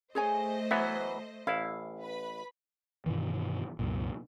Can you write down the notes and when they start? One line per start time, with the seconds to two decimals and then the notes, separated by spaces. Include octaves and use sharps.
0.15 A3 G#4 C5 C#5 D#5 G#5
0.71 E3 F#3 B3 E5
1.47 A1 E4 F5
2.00 B4 B5
3.06 G2 B2 D#3 E3
3.79 C2 F#2 A#2